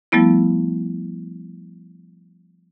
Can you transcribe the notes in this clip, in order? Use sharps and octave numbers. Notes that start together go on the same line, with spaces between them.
F3 G3 A3 B3 E4